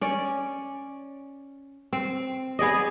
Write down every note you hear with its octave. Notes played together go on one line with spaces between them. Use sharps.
C#4 D5
C4
B3 G#4 D5 D#5